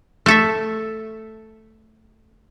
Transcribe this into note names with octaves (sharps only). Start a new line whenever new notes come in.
A3 A4 E5